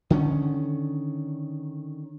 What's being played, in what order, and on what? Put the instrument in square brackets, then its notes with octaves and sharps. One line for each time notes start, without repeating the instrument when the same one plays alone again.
[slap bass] D3 D#3 C#4